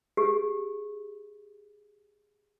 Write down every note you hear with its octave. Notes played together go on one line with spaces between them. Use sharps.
G4 G#4